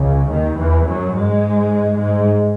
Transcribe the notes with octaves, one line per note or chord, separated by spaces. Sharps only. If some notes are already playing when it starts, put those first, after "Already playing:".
Already playing: C#2 C#3
D#2 D#3
E2 E3
F#2 F#3
G#2 G#3
G#2 G#3